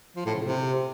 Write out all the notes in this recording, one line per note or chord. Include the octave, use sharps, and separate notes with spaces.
F3
A2
C#3
C3